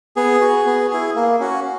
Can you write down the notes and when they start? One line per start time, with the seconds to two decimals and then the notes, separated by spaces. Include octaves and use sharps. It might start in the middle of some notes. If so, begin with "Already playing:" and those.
0.16 B3 G#4
0.41 F#4
0.66 B3
0.91 E4 G#4
1.16 A#3
1.40 C#4 F#4